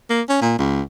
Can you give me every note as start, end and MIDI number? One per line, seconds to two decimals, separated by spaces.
0.10 0.21 58
0.29 0.38 61
0.41 0.54 46
0.59 0.82 37